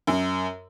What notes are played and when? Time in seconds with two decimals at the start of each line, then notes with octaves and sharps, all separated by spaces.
0.07 F#2